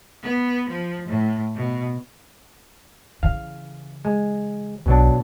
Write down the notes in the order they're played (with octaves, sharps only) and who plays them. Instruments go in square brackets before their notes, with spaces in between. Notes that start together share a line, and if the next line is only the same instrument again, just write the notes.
[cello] B3
F3
A2
B2
[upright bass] C#3 E3 [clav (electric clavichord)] F5
[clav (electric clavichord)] G#3
[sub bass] B1 [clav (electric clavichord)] B2 F#3 D4